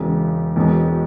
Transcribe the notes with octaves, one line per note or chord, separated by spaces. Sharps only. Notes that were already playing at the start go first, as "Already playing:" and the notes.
Already playing: E1 E2 C#3 G#3
E1 E2 B2 G#3